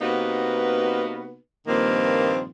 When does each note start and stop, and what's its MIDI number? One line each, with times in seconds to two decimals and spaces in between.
0.01 1.38 48
0.01 1.38 58
0.01 1.38 59
0.01 1.38 63
0.01 1.38 66
0.01 1.38 71
1.68 2.46 43
1.68 2.46 46
1.68 2.46 51
1.68 2.46 53
1.68 2.46 58
1.68 2.46 60